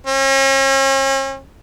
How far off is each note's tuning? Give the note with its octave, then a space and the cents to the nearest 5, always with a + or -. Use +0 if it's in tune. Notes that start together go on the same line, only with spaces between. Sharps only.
C#4 -40